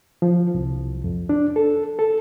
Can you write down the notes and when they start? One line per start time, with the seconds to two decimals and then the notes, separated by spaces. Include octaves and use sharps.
0.22 F3
0.55 C2
1.04 F2
1.29 D4
1.56 A4
1.99 A4